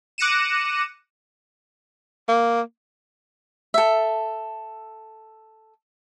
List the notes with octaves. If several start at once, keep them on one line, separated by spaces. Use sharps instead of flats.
D6 F#6 A#6 C#7 D#7 E7
A#3
A4 E5